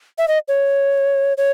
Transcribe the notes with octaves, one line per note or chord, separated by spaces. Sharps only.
E5
D#5
C#5
C#5